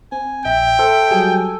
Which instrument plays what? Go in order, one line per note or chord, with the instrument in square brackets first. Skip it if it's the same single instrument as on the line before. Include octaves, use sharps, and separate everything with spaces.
[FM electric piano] C4 [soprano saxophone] G#5
[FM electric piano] A#1 [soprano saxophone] E5 [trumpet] G5
[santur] A4 [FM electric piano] C5
[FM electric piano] F#3 G3 G#4 [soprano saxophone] G#5